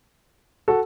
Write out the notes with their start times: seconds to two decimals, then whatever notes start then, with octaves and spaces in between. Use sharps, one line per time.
0.68 F#4 A4